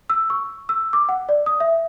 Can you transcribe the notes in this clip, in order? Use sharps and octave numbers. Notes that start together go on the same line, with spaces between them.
E6
C#6
E6
D6
F#5
D5
D#6
E5